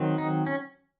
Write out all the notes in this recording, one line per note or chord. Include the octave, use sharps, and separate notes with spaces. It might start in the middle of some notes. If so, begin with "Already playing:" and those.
Already playing: D#3 F#3 C4
D#4
C#4